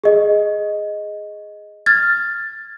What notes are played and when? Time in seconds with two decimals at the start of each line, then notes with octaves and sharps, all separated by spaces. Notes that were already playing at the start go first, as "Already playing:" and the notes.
0.04 G#4 D#5
1.86 F6 G#6 A6